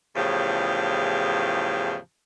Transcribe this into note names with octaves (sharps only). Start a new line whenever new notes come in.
E2 A2 C#3 F3 G4